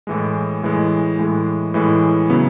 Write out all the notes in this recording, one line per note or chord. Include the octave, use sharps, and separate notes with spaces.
A2 E3 G#3
A2 E3 G#3
A2 E3 G#3
A2 E3 G#3
C#3 F#3 B3 E4